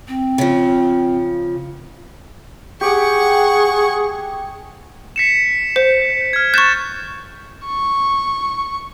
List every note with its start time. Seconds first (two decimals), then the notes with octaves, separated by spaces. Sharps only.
0.08 C4
0.38 C#3 F3
2.81 G4 G#4 F#5 C#6
5.16 B6 C#7 E7
5.76 C5
6.33 F6 G#6
6.54 C#6 F#6 G6 A6 E7
7.66 C#6